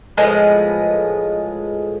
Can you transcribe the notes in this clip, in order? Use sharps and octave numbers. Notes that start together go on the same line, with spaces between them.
A2 F3 G#3 B3